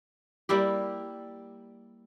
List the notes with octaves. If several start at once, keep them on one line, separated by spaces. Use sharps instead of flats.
G3 A#3 E4 G4